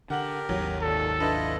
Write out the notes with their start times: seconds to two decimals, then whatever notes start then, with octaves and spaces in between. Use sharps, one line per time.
0.10 D3 G4 A#4 F#5 F#7
0.49 G#1 D#2 F#3
0.81 A#2 D#3 A4
1.20 D4 E4 F4 B4 D#5